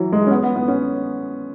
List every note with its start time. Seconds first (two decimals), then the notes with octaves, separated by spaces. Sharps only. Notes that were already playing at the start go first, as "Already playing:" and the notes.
Already playing: E3 F#3
0.13 G#3
0.27 C#4
0.31 B3
0.43 B3
0.56 B3
0.68 C#4